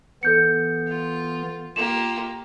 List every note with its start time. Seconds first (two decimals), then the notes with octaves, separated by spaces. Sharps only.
0.23 E3 B3 A4 G6 C#7
0.87 F4
1.76 A#3 F4 G4 E7